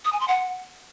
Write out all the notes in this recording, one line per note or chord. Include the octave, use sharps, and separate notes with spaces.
D#6
G#5
C6
F#5